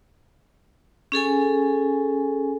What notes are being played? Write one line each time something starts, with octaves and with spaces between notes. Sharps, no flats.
C#4 G#4 A4 G#5